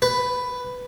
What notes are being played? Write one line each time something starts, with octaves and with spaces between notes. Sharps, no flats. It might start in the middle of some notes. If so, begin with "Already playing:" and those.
B4